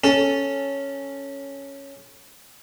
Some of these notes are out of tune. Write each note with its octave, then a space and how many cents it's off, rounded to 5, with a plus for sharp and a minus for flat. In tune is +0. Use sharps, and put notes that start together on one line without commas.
C#4 +0 A4 +0